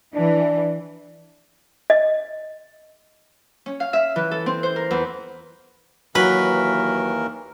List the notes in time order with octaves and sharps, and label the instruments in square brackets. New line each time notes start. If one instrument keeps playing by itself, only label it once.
[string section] E3 [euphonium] D4
[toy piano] D#5
[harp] C#4
F5
E5
E3
A4
C4
C5
A#4
E2
[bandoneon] D#2 E3 A#4 [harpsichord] F#3 [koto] B4